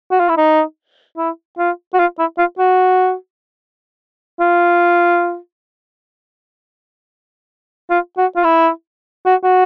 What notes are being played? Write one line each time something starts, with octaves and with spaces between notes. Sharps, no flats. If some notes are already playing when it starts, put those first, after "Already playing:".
F#4
F4
E4
D#4
E4
F4
F#4
F4
E4
F4
F#4
F4
F4
F#4
F4
E4
F#4
F#4